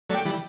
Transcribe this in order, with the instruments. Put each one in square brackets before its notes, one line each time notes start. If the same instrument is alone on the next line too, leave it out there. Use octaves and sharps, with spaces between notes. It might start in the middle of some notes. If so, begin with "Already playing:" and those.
[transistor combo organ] F#3 A3 [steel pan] D5 G5
[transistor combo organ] E3 G3